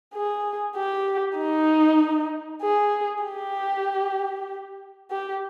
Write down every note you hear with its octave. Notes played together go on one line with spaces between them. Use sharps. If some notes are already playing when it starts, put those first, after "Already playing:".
G#4
G4
D#4
G#4
G4
G4